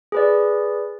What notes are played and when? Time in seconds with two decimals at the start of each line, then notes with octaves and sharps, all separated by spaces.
0.12 G#4 B4 D5